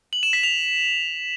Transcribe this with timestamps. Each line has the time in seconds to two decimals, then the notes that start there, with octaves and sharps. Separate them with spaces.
0.13 F#7
0.23 E7
0.33 B6
0.43 F7